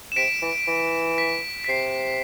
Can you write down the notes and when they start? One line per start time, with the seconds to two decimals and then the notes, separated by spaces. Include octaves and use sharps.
0.12 E7
0.16 C3 B6 D7
0.42 E3
0.68 E3
1.18 B6
1.64 B6
1.68 C3 C7